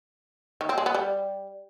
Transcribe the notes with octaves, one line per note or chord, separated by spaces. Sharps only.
D#3
C4
G#3
B3
G3